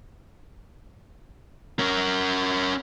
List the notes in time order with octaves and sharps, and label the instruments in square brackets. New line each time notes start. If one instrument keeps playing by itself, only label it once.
[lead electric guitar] C#4 A#4